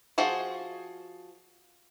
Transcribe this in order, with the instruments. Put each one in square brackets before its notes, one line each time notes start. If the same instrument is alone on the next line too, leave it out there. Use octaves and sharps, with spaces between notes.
[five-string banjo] F3 F#4 G#4 C5